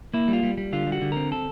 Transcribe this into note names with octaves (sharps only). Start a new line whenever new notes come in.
A#3 E4
G3
F4
G3
G3
D3 F4
G3
F#4
D3
C4 A#4
A4